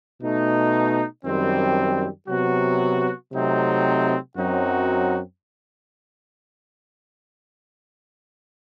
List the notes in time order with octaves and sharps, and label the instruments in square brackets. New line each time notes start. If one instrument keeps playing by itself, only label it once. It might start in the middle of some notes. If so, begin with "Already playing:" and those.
[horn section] B2 A3 D#4
F#2 D#3 G3 C4
C3 F#3 B3 F#4
C3 F#3 A3 C4 D#4
F#2 F#3 C4 D#4 F#4